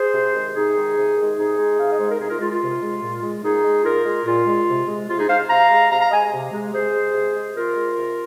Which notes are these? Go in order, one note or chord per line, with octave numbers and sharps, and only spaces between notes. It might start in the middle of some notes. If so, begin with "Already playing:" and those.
Already playing: G#4 C5
C3
D#3 G#3
C3 D#4 G#4
D#3 G#3
C3
D#3 G#3
C3 D#4 G#4
G#3
C3 F5
D#5
G#3 C5
A#4
C3 D#4 G#4
F4 A#4
G#3 F4
F4
C3
G#3
A#2
G#3
A#2 D#4 G#4
G#3
A#2 F4 A#4
G#3
A#2 F4
G#3
C3
G#3
C3 F4
D#4 G#4
G#3 C5 F5
C3 F5 A#5
G#3
C3 F5 A#5
F5 A#5
G#3 D#5 G#5
C3
G#3
C3 G#4 C5
G#3
C3
G#3
C3 F4 A#4
G#3
C3